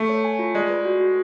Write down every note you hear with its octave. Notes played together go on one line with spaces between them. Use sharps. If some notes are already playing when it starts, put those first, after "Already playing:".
Already playing: A3
C#5
G#5
F4
G#3 D5
B4
F#4
F#4